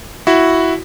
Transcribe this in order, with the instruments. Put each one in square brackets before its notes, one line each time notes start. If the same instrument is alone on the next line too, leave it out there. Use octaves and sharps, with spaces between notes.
[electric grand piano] E4 F#4